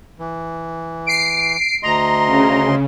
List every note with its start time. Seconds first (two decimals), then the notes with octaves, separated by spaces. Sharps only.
0.19 E3
1.06 C7 D7
1.83 D2 D#5 A#5 C6
2.26 C#3